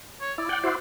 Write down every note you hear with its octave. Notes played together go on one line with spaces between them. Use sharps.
C#5
E4 D5
F#5 G5
E4 F#4 C5